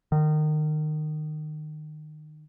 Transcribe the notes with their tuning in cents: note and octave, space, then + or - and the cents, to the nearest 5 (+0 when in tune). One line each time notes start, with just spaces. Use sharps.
D#3 -25